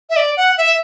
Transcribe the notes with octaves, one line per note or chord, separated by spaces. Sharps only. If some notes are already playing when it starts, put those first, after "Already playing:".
E5
D5
F#5
E5